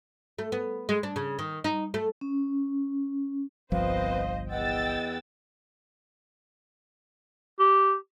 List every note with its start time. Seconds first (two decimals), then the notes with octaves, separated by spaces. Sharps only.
0.39 A3
0.52 B3
0.89 G#3
1.03 D4
1.16 C#3
1.39 D#3
1.64 D#4
1.94 A3
2.21 C#4
3.72 G1 C2 F3 C4 B4 C5 D#5 F5
4.51 E2 B3 D#5 F#5 G5 E6 A6
7.60 G4